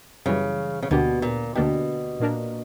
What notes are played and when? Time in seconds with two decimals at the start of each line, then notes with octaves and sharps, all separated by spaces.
0.26 F#2 C#3 E3 G3
0.82 C#3
0.90 D2 B2 D3 A#3 D4 G4
1.22 A#2
1.55 D2 B2 D3 A#3 D4 G4
2.20 A#2 A#3 D4 A#4